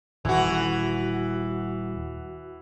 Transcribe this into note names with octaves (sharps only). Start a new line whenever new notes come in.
D#1 E3 F#4